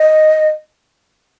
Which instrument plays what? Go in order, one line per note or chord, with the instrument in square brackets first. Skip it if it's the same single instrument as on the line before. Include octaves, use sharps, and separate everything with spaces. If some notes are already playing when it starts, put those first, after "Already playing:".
Already playing: [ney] D#5